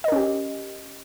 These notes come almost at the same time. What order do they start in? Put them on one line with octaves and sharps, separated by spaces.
D#5 A#4 C#4 G4